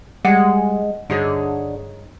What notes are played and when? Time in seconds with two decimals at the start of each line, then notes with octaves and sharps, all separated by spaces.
0.25 G3 G#3 F#5
1.10 G2 D3 D#4 G#4 C#5